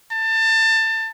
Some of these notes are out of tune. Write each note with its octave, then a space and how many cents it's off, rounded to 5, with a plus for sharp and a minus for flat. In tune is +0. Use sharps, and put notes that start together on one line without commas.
A5 +25